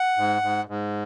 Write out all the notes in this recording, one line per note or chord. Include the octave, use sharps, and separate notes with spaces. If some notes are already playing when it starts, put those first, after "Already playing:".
Already playing: F#5
G#2
G#2
G#2